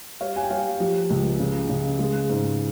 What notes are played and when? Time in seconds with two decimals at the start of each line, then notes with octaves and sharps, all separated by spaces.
0.20 G3 C#5 F5
0.36 G#5
0.43 G5
0.50 G3 C#5 F5
0.80 F3 G4
1.10 C#2
1.40 C#3
1.69 C#3
1.99 G#3
2.30 G#2